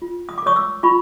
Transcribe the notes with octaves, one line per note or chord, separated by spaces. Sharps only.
F4
D#6
D6
A#4 C#5 C#6 D#6
D6 E6
F4 B5 C#6